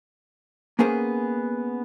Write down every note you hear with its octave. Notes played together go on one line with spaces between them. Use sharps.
A#3 B3 C#4 G#4 A#4 C5